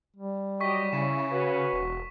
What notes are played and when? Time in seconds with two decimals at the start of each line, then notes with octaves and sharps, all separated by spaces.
0.16 G3
0.61 F#3 G4 D#5 C#6 B6
0.93 C#3 C#4 E4 E7
1.31 C#4 F#4 B4
1.73 E1